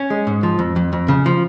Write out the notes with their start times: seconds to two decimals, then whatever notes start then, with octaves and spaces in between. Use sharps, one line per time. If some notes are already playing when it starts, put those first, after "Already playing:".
Already playing: C#4
0.10 G#3
0.27 G#2
0.43 F3
0.59 F2
0.76 F2
0.93 F2
1.08 C#3
1.26 F3